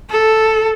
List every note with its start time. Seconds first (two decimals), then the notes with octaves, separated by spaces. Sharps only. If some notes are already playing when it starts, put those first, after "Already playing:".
0.10 A4